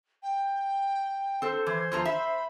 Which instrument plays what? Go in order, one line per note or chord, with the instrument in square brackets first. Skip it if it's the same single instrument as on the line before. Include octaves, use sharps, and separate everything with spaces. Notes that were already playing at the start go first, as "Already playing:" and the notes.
[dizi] G5
[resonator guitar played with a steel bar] C4 A4 [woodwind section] C5
[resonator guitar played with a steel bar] E3 [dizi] G#6
[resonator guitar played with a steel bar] E2 F3 A#5
[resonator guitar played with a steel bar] E5 [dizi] B5